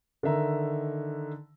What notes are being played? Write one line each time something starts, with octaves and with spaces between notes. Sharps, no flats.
D3 D#3 E5 A#5